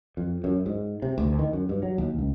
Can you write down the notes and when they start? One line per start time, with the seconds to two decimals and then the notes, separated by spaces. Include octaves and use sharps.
0.17 F2
0.44 F#2
0.66 G#2
1.02 C3
1.18 D2
1.39 D#3
1.53 F#2
1.69 G2
1.83 F#3
1.98 D#2
2.19 C#2